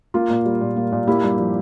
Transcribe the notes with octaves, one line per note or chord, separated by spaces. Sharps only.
A#3 F4
A#2
G3
A#2
A#3
A#2
A#3 E4 G4
G2
F3